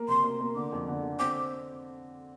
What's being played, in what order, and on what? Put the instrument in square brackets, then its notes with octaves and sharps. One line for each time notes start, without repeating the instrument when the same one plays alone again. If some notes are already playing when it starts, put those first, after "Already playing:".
Already playing: [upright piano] A#3
[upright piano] C3 [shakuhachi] C6
[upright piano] A#3
A#3
[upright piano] D3 [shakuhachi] D6
[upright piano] F2
D3
D3
[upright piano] C4 [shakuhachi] D6